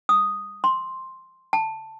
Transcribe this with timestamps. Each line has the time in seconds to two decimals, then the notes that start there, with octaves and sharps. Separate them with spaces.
0.09 D#6
0.64 C6
1.53 A5